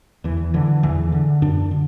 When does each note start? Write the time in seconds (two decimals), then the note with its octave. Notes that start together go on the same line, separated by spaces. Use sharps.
0.24 E2 E3
0.54 D3 E3
0.83 E2 E3
1.12 D3
1.42 F#2 D4
1.71 D3